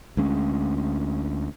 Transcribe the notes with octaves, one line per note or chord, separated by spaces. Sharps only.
D2 G#3 C#4